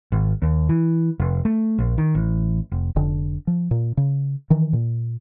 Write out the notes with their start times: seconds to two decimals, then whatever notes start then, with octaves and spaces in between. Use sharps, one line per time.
0.12 G#1
0.42 D#2
0.69 E3
1.20 F1
1.45 A3
1.78 A#1
1.98 D#3
2.15 A1
2.72 F1
2.96 F1 D3
3.47 F3
3.71 A#2
3.97 C#3
4.50 D#3 E3
4.73 A#2